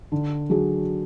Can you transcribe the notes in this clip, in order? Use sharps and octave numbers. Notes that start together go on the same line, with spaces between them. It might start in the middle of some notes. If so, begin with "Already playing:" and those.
D3
F#3 D4 G#4